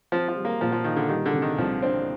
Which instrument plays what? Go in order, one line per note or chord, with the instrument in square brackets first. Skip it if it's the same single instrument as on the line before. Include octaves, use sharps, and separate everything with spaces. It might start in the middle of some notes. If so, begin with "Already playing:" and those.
[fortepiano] F3 [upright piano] C4
[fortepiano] F3
[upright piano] G3
[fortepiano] A#3
[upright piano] A#2 [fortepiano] F3
[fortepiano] F3
[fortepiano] D#3 [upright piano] F4
[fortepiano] D3
[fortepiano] D#3 [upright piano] G3
[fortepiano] D3
[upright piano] C3
[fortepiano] D#3
[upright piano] C2 [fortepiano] F3
[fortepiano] C4 [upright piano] D4